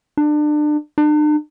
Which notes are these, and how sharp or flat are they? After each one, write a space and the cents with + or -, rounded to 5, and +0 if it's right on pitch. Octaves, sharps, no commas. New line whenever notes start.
D4 +30
D4 +45